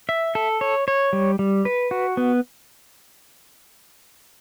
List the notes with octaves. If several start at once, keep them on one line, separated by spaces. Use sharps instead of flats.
E5
A4
C#5
C#5
G3
G3
B4
F#4
B3